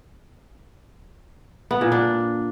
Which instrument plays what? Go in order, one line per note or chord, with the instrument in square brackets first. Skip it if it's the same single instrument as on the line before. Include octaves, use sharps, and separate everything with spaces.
[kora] B3
A#2
D4